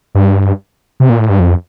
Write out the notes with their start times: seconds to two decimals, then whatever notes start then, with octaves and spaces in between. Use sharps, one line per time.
0.15 G2
1.00 C3
1.10 A#2
1.19 A2
1.29 G2
1.40 F2